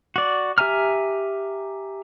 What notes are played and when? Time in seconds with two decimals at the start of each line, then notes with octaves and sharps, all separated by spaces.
0.16 F#4 D5
0.58 G4 E5 G#5 A#5 F6